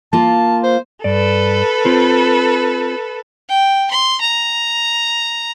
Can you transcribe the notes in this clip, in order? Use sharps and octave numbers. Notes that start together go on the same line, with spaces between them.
A#3 F4 A5
C5
G2 A4 B4 D5
C4 F4 C5
G5
C6
A#5